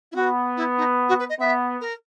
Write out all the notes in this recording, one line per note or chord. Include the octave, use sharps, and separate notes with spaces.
E4
B3 F#4
E4
D#4
F#4
B4
D#5
B3 E5
A#4